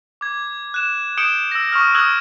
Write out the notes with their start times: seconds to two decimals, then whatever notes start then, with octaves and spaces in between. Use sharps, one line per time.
0.21 D6 G#6
0.74 F#6 E7
1.18 D#6 G6 C#7 D7 E7 G7
1.52 E6 A#6
1.72 C#6 D#6 F6
1.94 C#6 D#6 E6 F#6 G#6 G7